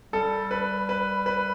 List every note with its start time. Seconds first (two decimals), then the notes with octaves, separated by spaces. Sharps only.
0.13 G3 A4
0.51 B4
0.89 B4
1.26 B4